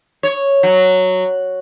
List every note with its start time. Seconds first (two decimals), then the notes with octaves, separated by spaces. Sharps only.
0.23 C#5
0.63 F#3